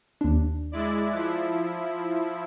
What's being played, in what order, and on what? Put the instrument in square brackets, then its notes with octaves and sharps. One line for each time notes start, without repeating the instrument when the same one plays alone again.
[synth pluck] D#2 D4
[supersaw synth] G#3 E4 D5
[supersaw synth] F3 E4 [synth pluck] F#6 A6